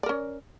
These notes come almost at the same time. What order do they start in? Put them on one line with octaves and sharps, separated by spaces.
D5 A#4 C#4